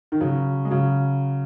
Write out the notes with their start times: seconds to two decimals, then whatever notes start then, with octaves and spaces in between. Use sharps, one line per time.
0.12 D#3
0.21 C#3 F#3
0.65 G#3
0.71 C#3 F#3